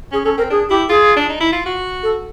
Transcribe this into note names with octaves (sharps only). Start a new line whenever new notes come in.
C#4 G#4
C#4 A4
C4 A#4
D4 G#4
E4 G4
F4 G#4
D4
D#4
E4
F4
F#4
A4